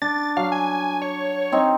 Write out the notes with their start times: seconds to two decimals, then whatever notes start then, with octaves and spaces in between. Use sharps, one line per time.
0.02 D4 A6
0.37 F#3 F5
0.52 G#5
1.02 C#5
1.52 C4 D#4